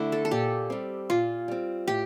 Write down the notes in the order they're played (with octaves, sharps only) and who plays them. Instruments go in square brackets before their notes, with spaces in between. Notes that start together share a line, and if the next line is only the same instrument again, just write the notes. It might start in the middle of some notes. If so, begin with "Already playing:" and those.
Already playing: [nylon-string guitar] D3 A3 E4 [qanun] D5
[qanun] A4
A4
[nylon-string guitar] A#2 [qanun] G4
[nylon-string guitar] G3 C4
[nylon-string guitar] A#2 [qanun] F4
[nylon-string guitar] G3 C4
[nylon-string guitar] A2 [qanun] G4